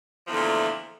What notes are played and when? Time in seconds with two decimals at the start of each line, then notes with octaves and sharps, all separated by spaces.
0.25 F3
0.28 E2
0.31 D3
0.33 A3
0.36 A#2